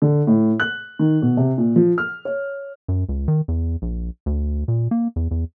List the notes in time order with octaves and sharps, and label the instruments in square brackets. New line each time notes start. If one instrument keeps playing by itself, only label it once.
[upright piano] D3
A2
F#6
D#3
B2
C3
A#2
F3
F6
C#5
[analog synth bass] F#2
C#2
D#3
E2
A#1
D2
A#2
A#3
E2
E2